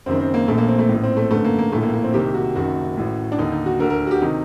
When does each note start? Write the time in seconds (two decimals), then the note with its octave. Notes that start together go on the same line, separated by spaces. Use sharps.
0.06 F#1 F#2 D#3 C4
0.20 C4
0.34 A#3
0.48 A#1 A#2 A3
0.58 A#3
0.68 C4
0.79 A3
0.89 A2
0.94 A1
1.03 C4
1.17 A3
1.31 G1 F#2 D3 A3
1.44 A#3
1.58 A#3
1.72 A#1 A2 A3
1.83 A#3
1.93 A#3
2.04 C4
2.14 C2 C3 D#3 G4
2.34 F#4
2.55 F#1 F#2 D#3 F#4
2.97 A1 A2
3.32 D4
3.38 D#2 D3 D#4
3.52 D#4
3.66 F#4
3.80 D2 D3 A#4
3.90 A#4
4.07 F#4
4.11 G4
4.22 C3 D#3 D#4